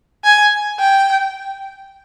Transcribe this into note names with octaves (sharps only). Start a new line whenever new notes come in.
G#5
G5